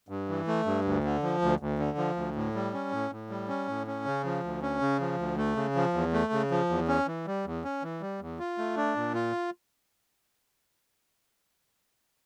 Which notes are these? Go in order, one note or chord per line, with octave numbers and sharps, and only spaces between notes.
G2
E3
A3
G2
D2
D3
F3
D2
D2
D3
F3
D2
A2
G3
C#4
A2
A2
G3
C#4
A2
C#4
C#3
F3
D2
C#4
C#3
F3
D2
A3
C#3
F3
E2
A3
C#3
F3
E2
C#4
E3
G3
E2
C#4
E3
G3
E2
F4
A3
D4
A#2
F4